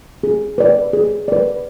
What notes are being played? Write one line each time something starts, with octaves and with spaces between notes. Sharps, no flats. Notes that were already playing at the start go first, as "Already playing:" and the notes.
G#4
B4 D5
G#4
B4 D5